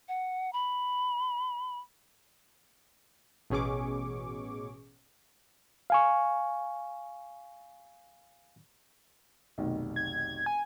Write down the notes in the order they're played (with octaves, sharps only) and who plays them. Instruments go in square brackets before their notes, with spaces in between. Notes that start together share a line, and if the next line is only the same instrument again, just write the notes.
[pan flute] F#5
B5
[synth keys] A1 B2 C#4 G#4 C#6 D6
[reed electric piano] F5 G#5 C#6
[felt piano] F1 B1 D#3
[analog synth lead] G#6
G#5